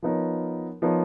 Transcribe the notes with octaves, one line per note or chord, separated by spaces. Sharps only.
F3 B3 D#4 A#4 C#5
F3 B3 D#4 A#4 C#5